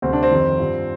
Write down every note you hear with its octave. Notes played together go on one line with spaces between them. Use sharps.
D2 C3 G3 C4
D4
C4
F2 D#3 G3
G2 F3